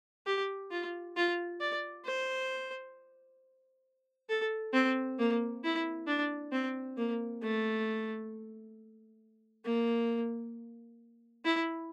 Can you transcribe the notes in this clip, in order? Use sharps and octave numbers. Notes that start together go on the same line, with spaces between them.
G4
F4
F4
D5
C5
A4
C4
A#3
E4
D4
C4
A#3
A3
A#3
E4